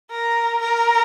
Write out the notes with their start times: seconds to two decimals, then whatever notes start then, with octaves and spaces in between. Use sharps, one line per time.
0.11 A#4
0.62 A#4